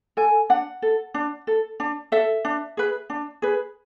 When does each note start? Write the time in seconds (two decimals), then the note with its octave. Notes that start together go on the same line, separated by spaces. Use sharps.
0.17 A4 G#5
0.49 D4 F#5
0.82 A4
1.14 D4
1.47 A4
1.80 D4
2.12 A4 E5
2.45 D4
2.77 G#4 B4
3.10 D4
3.42 G#4 B4